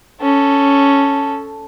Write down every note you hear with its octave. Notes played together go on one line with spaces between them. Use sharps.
C#4 A4